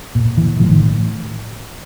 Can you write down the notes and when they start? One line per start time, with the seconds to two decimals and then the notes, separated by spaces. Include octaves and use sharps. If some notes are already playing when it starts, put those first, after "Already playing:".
0.15 A#2
0.37 E3
0.60 A2 F3
0.72 D#3